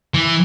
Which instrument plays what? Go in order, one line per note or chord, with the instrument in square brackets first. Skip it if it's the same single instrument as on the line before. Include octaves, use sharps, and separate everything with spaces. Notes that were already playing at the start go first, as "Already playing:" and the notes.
[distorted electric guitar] E3